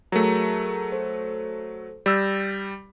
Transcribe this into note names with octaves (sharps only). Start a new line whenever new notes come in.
F#3 A3 G#4 A#4 A#5
A4 C5
G3 E6 G6 A6 A#6